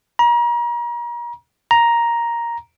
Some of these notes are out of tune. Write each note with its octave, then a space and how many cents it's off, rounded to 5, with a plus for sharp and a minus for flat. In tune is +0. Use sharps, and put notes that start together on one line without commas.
A#5 +35
A#5 +5